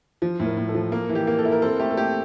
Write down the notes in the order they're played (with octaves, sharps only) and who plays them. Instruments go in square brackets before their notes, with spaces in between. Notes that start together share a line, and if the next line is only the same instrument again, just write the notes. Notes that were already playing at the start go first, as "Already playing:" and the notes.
[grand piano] F3
A2
[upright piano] A#4
[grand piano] A2
[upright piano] A4
[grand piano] F3
[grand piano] A#3 [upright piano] A#4
[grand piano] E3
[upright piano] G4
[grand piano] A#3
[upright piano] A4
[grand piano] E4
[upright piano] A#4
[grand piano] C4 [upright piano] A4
[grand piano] A3 [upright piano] G4
[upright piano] A4
[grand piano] A3 [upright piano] G4